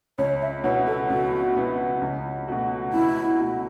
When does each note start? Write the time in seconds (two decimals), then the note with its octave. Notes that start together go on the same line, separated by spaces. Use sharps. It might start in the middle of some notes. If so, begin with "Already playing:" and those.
0.18 C#2 C#5
0.42 E5
0.64 B2 B3 E4 C#5
0.87 A4
1.09 C#2 F#4
1.56 B2 B3 E4
2.01 C#2
2.48 B2 A3 F#4
2.93 C#2 E4
3.39 B2 A3 F#4